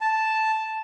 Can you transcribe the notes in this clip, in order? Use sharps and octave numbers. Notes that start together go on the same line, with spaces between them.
A5